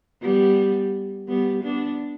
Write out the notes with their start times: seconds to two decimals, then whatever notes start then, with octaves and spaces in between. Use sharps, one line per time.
0.22 G3 B3
1.28 G3 B3
1.63 B3 D4